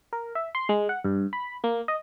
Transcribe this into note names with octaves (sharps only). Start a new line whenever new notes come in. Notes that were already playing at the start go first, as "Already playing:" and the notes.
A#4
E5
C6
G#3
F#5
G2
B5
A#3
D#5